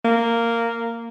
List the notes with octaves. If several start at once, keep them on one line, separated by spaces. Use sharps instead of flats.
A#3